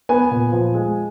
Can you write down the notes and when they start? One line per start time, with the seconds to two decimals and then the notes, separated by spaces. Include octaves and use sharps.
0.09 B3 G#5
0.31 A#2
0.52 F3
0.74 G#3